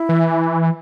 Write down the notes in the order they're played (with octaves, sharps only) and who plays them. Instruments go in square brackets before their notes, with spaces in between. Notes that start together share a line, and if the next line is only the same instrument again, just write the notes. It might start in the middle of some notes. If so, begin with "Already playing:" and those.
Already playing: [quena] E4
[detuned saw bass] E3